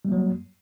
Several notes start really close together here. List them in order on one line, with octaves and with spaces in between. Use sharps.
G3 A#3 F#3